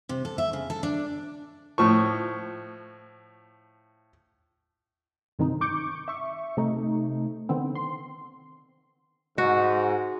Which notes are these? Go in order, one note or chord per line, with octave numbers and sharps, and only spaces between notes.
C3
A4
E5
C#3
A4
D4
A2 F3 C#6
G2 C3 D#3 C4 D#4
C#6 D6 G6
E5 C#6
C3 A3 D#4
D3 D#3 B3 C4
C6
G#2 F#4